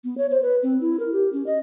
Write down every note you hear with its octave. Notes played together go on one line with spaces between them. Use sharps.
B3
C#5
C5
B4
C4
E4
A#4
G4
C#4
D#5